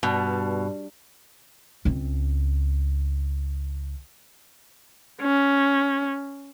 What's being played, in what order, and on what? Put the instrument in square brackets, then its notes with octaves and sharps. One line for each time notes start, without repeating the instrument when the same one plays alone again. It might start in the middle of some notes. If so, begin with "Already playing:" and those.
[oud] G2 [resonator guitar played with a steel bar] B2
[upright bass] C#2 C4
[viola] C#4